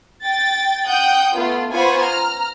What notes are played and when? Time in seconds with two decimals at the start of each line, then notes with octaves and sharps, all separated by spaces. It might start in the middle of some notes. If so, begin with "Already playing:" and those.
0.24 G5 A6
0.84 F#5 G5 D#6 G6
1.36 A3 B3 F4
1.71 B3 F4 C5 G#5 B5 C#6
2.03 A#5 F6